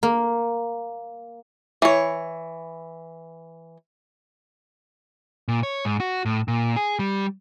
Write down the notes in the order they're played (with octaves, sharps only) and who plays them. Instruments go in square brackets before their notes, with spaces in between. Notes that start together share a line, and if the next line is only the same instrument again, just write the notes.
[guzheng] A#3
[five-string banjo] E3 C#5
[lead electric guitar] A#2
C#5
G#2
F#4
A2
A#2
G#4
G3